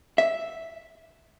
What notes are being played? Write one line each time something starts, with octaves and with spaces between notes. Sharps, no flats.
E5